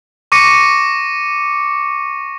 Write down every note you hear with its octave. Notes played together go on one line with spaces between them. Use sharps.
C#6 D6 A#6 C#7 D#7